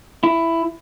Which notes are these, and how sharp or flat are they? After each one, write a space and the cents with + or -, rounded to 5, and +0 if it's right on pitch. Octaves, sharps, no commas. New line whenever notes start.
E4 +10